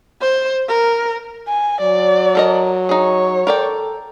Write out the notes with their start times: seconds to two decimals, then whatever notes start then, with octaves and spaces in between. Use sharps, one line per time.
0.21 C5
0.68 A#4
1.47 G#5
1.81 F#3 D5
2.35 A4 A#4 D#5
2.89 D#4 G#4 C#5
3.47 A4 A#4 D5 G5